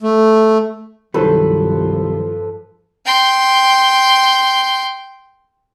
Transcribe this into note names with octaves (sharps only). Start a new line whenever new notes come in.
A3
C2 G2 D#3 F3 F#3 A4 B4 C5
G5 C6